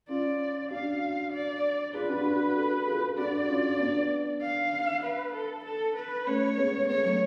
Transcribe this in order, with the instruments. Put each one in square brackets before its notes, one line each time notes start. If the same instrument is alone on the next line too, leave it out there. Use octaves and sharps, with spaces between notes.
[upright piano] C#4 F4 [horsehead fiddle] D5
[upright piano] D4 F#4 [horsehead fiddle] F5
[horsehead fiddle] D5
[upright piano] F4 G#4 [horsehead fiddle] B4
[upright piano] D4 F#4
D4 F#4
F#4 A4
F4 G#4
[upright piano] D4 F#4 [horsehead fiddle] D5
[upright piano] C#4 F4
B3 D4
[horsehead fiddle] F5
B4
A4
A4
B4
[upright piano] A3 C#4 [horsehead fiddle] C#5
[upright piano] G#3 B3
[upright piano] G#3 B3 [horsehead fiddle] C#5
[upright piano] F#3 A3